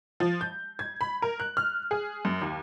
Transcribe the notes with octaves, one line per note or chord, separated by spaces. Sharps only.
F3
G6
G#6
B5
A#4
F#6
F6
G#4
F#2
D#2